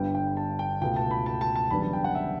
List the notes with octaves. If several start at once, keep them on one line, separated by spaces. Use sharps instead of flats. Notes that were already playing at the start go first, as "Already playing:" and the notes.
Already playing: G1 G2 D3 G3 B3 G5
G5
A5
G5
C#2 B2 A3 G5
A5
B5
A5
A5
A5
F#1 E2 D3 G3 B3 B5
A5
G5
F#5
E5